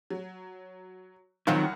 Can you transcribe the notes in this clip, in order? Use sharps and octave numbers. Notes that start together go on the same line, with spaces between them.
F#3
C2 D#3 F3 F#3 C4 F5 F#5